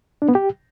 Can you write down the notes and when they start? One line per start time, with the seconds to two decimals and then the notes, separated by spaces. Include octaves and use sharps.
0.22 D4
0.28 B3
0.35 G4